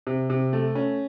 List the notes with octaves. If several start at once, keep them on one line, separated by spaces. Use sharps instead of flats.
C3
C3
A3
C#4